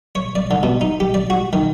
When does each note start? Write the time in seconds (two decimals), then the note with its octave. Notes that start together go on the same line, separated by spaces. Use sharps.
0.15 C#5
0.35 D5
0.51 D3
0.63 B2
0.81 D#4
1.00 G4
1.14 D5
1.30 F#4
1.53 D#3